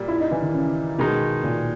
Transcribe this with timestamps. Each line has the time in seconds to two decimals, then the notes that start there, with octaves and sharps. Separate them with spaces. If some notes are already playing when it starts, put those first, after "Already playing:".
Already playing: A#2 G3
0.08 E4
0.20 D#4
0.31 E3
0.42 D#3
0.53 C#3
0.98 B2 D#3 G#3 D#4
1.43 A#2